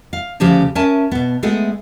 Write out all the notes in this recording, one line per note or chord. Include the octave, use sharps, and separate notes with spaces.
F5
D2 C#3 F3 G4 G#4 A5
C#4 A#4 E5 G#5 A5
B2 B3
G#3 A3 B3 G#4